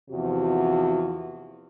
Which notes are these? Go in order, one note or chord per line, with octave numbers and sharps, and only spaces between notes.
E2 C3 F3 F#4